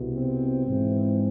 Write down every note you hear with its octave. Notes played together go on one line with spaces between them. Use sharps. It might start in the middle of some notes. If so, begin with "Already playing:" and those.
Already playing: C2 B2
C4
G#2 E3